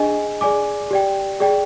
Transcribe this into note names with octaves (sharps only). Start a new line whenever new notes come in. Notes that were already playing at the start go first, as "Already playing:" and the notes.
Already playing: D4 G#4 D#5 G#5
G#4 D5 G#5 D6
G4 D5 G5
G#4 D5 G5